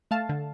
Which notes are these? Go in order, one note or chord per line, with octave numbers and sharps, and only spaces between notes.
A3 F5 A5
D3